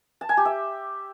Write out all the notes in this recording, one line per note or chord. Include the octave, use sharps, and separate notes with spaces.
A5
G#5
G4
E5